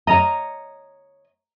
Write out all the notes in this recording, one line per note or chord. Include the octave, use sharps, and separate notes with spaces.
C#5 D#5 A#5